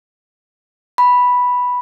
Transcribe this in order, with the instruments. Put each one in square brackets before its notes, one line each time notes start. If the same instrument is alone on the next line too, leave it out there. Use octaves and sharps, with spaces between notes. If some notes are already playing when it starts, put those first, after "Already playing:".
[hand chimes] B5